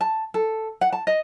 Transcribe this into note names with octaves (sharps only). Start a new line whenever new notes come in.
A5
A4
F#5
A5
D#5